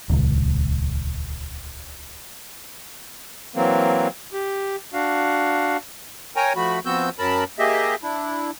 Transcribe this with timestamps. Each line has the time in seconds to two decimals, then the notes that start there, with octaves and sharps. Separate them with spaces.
0.10 D#1 C#2
3.55 E3 F#3 A#3 C4
4.33 G4
4.94 D4 F#4 F5
6.36 A#4 C#5 G5 G#5 A#5
6.56 F3 A3 F#4 B5
6.85 F3 B3 C4 F#4 E6 G6
7.19 F#2 F#3 A#4 A5 B5
7.59 A#3 G4 G#4 D#5 E5
8.03 D4 E4